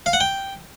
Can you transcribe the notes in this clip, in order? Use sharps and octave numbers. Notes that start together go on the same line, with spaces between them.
F5
F#5
G5